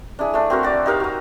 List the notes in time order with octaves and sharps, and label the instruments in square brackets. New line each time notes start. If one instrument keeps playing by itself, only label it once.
[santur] D4 E4 G#4
A3 D4
C4 F#4 A#4
F#4 D5
D#4 G4 A#4 F5
F#4 D#6